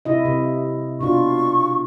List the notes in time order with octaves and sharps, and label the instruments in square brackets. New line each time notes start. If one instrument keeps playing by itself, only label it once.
[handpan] C3 E4 D#5
C3
[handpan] B2 D4 F4 [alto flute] C#6